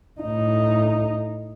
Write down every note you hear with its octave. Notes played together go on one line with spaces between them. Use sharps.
A2 D#4